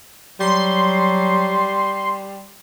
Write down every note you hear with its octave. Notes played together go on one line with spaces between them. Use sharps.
F#3 G3 C6